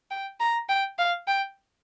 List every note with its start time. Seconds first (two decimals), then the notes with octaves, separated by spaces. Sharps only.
0.11 G5
0.40 A#5
0.69 G5
0.99 F5
1.27 G5